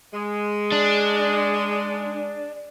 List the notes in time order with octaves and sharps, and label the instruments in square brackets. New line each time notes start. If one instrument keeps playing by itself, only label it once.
[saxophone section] G#3
[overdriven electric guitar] D4